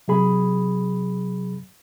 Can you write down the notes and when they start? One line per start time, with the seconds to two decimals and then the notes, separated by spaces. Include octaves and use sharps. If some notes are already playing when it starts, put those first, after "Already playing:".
0.08 C3 F#3 G#4 B5